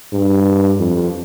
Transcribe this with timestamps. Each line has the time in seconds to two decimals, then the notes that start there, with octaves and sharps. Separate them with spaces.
0.13 G2
0.80 F2